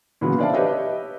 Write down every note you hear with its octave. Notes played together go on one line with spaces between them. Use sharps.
A#2 C#3 E3 F#3 B3
D4 C5 D5 E5 F5 A5
G4 B4 C#5 D#5 E5